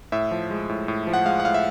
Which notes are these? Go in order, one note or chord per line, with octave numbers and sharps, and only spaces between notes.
A2 E5
F3
G#3
A2
A2
F3
F#5
G#3 F5
F#5
A2 F5
E5